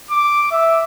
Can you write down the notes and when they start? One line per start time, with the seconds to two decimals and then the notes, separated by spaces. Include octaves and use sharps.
0.11 D6
0.51 E5